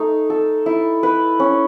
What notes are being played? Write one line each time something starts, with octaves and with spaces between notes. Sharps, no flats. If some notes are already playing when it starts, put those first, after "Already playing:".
Already playing: A3 D#4
A4
E4
B4
C#4